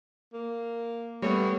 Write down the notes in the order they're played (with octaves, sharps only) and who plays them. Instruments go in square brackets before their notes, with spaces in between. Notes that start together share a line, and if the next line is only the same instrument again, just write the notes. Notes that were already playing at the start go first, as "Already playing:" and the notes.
[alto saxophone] A#3
[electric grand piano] G3 A3 B3 [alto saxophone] C#5